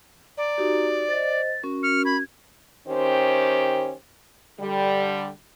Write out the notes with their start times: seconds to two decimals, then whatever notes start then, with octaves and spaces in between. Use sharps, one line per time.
0.38 D5 A#5
0.58 D#4 F#4 G4
1.08 C5 D#5 A6
1.63 C#4 F#4 A#4
1.83 F6 C#7
2.05 B5 G#6
2.87 D#3 C#4 G4 C5
4.59 D3 G3